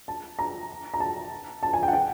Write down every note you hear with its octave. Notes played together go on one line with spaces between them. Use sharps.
A5
A#5
A#5
A5
A5
G#5
G5
F#5
G5